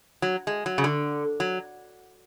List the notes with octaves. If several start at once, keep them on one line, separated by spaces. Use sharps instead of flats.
F#3
G#3
F#3
C#3
D3
F#3